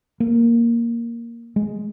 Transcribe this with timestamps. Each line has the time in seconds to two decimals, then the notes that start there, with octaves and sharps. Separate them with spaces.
0.20 A#3
1.56 G#3